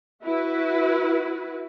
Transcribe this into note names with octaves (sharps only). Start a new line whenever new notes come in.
E4 F#4 B4